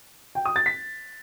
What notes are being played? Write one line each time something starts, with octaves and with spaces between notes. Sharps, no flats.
G5
D#6
A6
B6